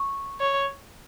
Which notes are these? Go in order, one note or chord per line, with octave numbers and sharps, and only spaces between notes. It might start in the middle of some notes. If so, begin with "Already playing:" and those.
Already playing: C#6
C#5